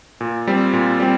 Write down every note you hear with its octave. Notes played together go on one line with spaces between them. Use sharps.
A#2
G3 C4
A#2
G3 C4